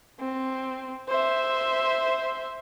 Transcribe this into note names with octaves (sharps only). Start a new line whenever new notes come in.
C4
C5 E5